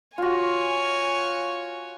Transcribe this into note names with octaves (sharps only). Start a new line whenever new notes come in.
F4 F#4 C#5 G#5